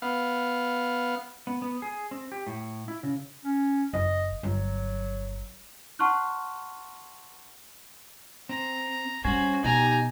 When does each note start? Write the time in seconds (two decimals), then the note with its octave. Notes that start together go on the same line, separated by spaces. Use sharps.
0.02 B3 F5
1.47 B3
1.62 B3
1.82 G#4
2.11 C4
2.32 G4
2.47 A2
2.88 E4
3.03 C#3
3.45 C#4
3.93 F#1 D#5
4.43 G1 F#3
5.99 F#5 A5 C6 C#6 F6 F#6
8.49 C4 A#5
9.25 G3 C#4 F#4 C5 G#5
9.64 B2 D#4 G4 G#5 A#5